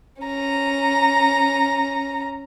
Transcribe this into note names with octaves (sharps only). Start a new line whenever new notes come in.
C#4 A#5